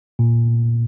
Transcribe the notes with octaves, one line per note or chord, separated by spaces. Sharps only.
A#2